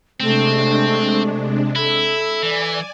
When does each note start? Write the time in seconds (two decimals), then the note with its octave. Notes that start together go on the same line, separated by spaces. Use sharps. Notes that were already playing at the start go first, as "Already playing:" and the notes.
0.20 C3 G#3 A3 C4 D4
1.76 E4 A4
2.42 E3 D5 G#5